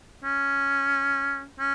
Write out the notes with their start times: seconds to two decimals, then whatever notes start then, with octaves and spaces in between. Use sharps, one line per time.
0.24 C#4
1.59 C#4